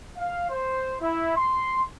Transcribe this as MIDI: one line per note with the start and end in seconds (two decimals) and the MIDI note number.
0.16 0.46 77
0.50 0.95 72
1.00 1.35 64
1.36 1.82 84